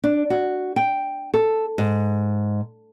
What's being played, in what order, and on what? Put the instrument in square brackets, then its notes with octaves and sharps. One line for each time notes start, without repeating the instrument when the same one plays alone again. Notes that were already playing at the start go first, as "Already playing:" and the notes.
[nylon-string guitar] D4
F#4
G5
A4
G#2